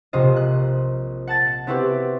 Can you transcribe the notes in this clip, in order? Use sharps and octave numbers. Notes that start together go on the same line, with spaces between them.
A#1 C3 F4 D#5
F#6
F#5 A5 A6
B3 C4 E4 F#4 G4 B4